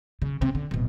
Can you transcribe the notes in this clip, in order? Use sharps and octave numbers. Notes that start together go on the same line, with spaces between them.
C#3
C3
D3
D1 B2